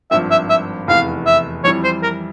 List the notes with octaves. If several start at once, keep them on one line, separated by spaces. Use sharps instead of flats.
G#1 G2 F3 E5
E5
E5
F1 E2 E3 F5
E5
F2 E3 G3 C#5
C5
A#4